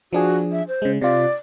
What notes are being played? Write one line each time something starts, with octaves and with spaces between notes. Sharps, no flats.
F3 D4 F#4 G#4
E5
C5
C#3 G#3
C3 F4 D5